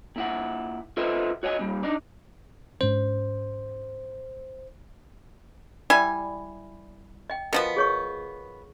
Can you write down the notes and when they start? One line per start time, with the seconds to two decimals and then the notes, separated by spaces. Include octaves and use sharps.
0.16 A#2 E4 F#5
0.97 F4 A4 B4 C5 D#5 E5
1.43 F#4 C#5 D#5 F#5 G#5
1.59 A#2 G3
1.83 D4 D#4 D5
2.81 G#2 C#4 D4 C5
5.90 G3 E4 D5 G#5 B5
7.30 D#5 G5
7.53 B2 F3 B3 A4 A#4
7.76 G#4 C#5 C#6